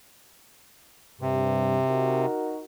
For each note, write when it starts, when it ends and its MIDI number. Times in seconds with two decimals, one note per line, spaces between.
1.21 1.79 43
1.21 2.26 48
1.88 2.62 63
1.88 2.62 66
1.88 2.62 70